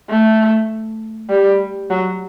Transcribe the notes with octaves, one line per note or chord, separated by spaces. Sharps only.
A3
G3
F#3